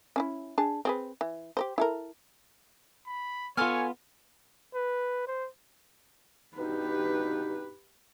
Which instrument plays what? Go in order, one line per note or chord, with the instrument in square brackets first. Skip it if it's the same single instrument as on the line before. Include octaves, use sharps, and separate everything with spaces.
[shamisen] C#4 D4 E4
D4 G#4 A5
C4 G#4 B4
E3
G4 A#4 C5
E4 A4 A#4
[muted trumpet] B5
[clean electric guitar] B3 F4 [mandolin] A4 G#5 F6 [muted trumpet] C#5
[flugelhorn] B4
C5
[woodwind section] G2 B2 D#4 [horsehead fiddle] G4 B4